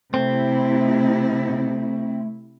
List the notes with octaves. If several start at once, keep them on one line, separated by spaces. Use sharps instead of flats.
C3 A3 C4 E4